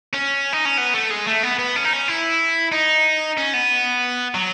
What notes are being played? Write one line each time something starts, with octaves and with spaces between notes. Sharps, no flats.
C#4
D#4
C#4
B3
A3
G#3
A3
B3
B3
C#4
D#4
C#4
E4
D#4
C#4
B3
F#3